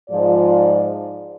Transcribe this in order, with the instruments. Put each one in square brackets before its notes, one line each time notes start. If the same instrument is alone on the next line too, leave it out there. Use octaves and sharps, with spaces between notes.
[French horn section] G#2 F3 G#3 F4 D5